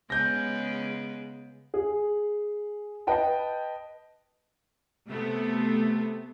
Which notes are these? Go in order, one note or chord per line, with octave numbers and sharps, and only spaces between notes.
C#3 G#3 B3 G6 A#6
G#4
B4 D#5 G5 A5
C3 A3 B3